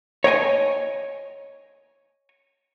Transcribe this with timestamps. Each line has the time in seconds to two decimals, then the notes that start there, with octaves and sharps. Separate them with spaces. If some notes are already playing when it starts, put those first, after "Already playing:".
0.24 C#5 D#5 G5 G#5